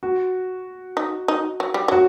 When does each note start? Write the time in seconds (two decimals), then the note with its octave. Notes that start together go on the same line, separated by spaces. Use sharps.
0.03 F#4
0.97 D#4
1.28 D#4
1.60 F#3
1.74 G3
1.88 F#3 F#4